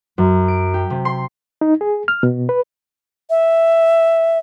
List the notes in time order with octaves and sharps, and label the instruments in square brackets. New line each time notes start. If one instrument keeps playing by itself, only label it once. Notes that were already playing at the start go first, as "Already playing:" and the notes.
[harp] F#2
D7
G4
C3
C6
[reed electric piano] D#4
G#4
F6
B2
B4
[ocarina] E5